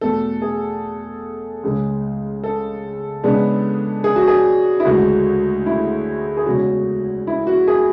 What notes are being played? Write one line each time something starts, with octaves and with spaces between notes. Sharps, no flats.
E2 B2 A3 A4
G#4
C#2 C#3 G#3
A4
C#3 G#3 B3 D4
G#4
F#4
G#4
E4
D2 C#3 G#3 F#4
E4
G#4
E2 C#3 G#3 C#4 F#4
E4
F#4
G#4